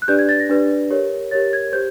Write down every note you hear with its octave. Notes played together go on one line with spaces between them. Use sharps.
F#6
D4 G4 B4 D5 G6
G#6
A6
A#6
D4 G4 B4 D5
G4 A#4 C#5
G4 A#4 C#5 A6
G#6
G4 C5 G6